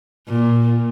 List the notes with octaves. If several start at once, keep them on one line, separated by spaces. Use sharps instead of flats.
A#2